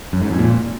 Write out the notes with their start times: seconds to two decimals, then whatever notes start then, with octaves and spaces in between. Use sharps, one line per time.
0.13 F#2
0.22 G#2
0.30 F2
0.39 A#2